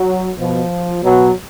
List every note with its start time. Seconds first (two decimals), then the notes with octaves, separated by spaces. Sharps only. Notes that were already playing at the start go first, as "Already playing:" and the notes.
Already playing: F#3
0.38 B2 F3
1.03 B2 F#3